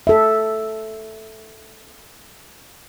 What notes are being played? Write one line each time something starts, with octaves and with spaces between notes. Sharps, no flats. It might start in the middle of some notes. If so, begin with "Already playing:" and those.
A4 E5